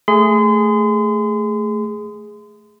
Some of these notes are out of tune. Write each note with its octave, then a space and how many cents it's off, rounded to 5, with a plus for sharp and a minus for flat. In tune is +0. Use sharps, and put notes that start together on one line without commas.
A3 +0 G#4 +0 C6 -35